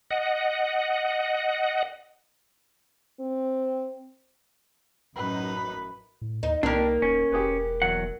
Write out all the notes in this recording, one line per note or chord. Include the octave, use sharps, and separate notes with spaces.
D#5 F#5
C4
A1 F#2 D#4 B4
A2
D#2 D#4
C2 D#3 A#3 D4 G4 A#4
D1 C#4
E1 G4 G#4 B4
E2 F#3 F#5